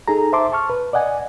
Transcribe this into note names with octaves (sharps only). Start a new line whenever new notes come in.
D#4 G#4 A4 A#5
C5 E5 A5 C6 D6
A5 C#6 F6
B4
D5 D#5 F#5 G#5